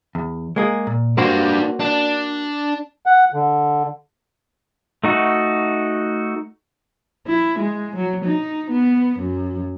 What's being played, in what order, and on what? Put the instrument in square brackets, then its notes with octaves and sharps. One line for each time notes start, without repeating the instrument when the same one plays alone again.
[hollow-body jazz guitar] E2
G#3 A#3 G#4
A#2
[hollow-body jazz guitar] A#3 F#4 C5 [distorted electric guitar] D4 B4
[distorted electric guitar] D4
[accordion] F#5
D3
[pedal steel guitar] A3 D#4 F#4
[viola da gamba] E4
G#3
F#3
D#4
B3
F#2